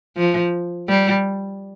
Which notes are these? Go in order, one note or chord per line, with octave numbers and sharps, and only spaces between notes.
F3
G3